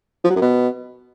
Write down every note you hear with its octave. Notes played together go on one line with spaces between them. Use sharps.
F3
F#3
F#2
B2